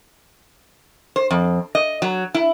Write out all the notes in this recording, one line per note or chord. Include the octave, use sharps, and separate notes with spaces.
C5
F2
D#5
F#3
E4